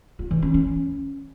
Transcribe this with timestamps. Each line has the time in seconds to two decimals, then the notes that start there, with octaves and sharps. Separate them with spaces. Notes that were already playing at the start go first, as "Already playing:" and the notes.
0.19 F4
0.31 E3
0.42 C#4
0.54 C#4